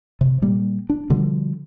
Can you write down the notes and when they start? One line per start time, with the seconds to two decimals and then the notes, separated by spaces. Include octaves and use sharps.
0.21 C3
0.42 A#2 G3 A#3
0.90 D4
1.10 B2 D3 F3 G3